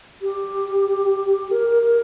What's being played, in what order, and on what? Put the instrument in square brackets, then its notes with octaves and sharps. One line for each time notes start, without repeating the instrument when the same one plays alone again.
[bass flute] G4
A#4
A#4